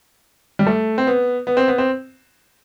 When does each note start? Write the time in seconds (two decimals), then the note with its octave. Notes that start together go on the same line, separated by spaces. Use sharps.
0.59 G3
0.67 A3
0.98 C4
1.07 B3
1.47 B3
1.57 C4
1.68 B3
1.78 C4